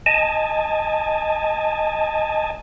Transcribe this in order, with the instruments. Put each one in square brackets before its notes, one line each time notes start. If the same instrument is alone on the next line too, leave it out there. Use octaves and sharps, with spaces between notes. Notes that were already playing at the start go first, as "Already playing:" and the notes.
[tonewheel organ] D#5 G#5 A5